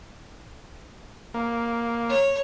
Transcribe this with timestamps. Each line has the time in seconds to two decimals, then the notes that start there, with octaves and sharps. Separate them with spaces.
1.34 A#3
2.10 C#5